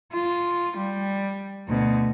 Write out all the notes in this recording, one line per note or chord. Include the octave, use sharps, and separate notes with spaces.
F4
G3
D2 B2